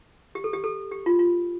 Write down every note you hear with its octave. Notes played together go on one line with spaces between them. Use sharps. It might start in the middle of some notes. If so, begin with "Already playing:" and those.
G4
A4
G4
A4
G4
F4
F4